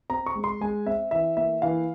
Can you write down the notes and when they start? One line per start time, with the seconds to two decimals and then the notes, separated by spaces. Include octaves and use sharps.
0.10 C4 A#5
0.26 C#6
0.36 G#3
0.44 C6
0.61 G#3 G#5
0.86 C4 E5
1.11 E3 E5
1.36 A#3 E5
1.62 E3 F5